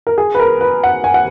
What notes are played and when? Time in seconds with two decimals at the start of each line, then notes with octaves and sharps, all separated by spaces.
0.07 A#4
0.18 G#4
0.35 B4
0.40 A#4
0.61 B4
0.84 F#5
1.04 G#5
1.14 F#5